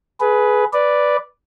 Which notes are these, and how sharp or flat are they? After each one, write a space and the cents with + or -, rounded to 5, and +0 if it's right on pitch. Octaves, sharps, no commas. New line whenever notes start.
G#4 +20 B4 +0
B4 +0 D5 +0